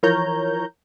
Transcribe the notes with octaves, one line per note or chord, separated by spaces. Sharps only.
E3 F3 A#4 C#5 A#5 G6